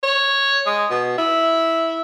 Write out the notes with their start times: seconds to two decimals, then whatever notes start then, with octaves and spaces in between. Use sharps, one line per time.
0.03 C#5
0.66 G#3
0.91 B2
1.18 E4